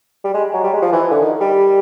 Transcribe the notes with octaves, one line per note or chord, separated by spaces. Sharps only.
G3
G#3
F#3
G3
G#3
F3
E3
D3
D#3
G3